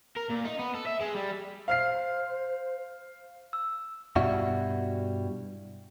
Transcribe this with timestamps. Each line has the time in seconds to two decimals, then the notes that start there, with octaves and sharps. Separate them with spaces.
0.16 A#4
0.30 A#2
0.44 D#4
0.59 B3
0.75 A4
0.86 E5
1.01 G#3
1.15 G3
1.68 C5 F5 F6 C7
3.53 E6
4.16 G2 B2 G3 E4 F#4